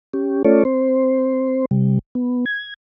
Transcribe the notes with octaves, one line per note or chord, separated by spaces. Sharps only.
C#4 G4
A3 C#4 F4 A4 C#5 D5
C4 C5
C3 G3
B3
G#6